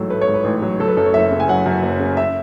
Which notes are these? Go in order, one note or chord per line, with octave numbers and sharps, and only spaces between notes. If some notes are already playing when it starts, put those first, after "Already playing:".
Already playing: A1 G#2 F#3 A3 A4
A3 B4
C#5
G#2
B4
A1
F#3
F#3 A4
B4
F#2 A4
C#5
F#1 E5
C#3
G#5
F#3 F#5
F#2
F#1
C#3
E5